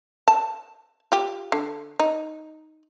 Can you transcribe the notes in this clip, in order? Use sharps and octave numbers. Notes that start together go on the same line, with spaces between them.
A5
F4 G4
D3
D#4